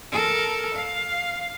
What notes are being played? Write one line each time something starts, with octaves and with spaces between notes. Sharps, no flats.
A4 A#4
F5